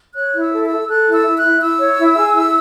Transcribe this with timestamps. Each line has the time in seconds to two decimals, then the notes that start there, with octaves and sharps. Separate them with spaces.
0.16 C#5 F#6
0.34 E4
0.40 E6
0.52 A4
0.65 E6
0.71 A4
0.88 A4 F#6
1.07 E4
1.13 E6
1.25 E4
1.37 F#6
1.43 E4
1.61 E4 E6
1.79 C#5
1.98 E4
2.16 G#4
2.33 E4